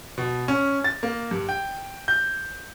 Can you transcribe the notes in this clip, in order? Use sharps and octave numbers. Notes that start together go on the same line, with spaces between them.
B2
C#4
A6
A#3
G2
G5
G6